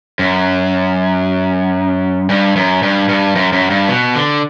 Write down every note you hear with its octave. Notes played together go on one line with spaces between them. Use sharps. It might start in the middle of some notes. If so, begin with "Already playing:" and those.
F#2
G2
F#2
G2
G2
F#2
F#2
G2
B2
D3